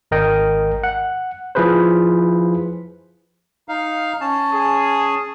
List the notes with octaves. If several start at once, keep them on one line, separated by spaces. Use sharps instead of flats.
G#1 A#4 D#5 G5
F#5
F3 E4 G#4 B4 C5
D#4 F5
C#4 A5
G#4